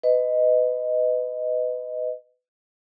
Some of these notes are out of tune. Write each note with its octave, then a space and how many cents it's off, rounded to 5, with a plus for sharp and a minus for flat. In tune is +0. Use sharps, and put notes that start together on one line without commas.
B4 +25 D#5 +0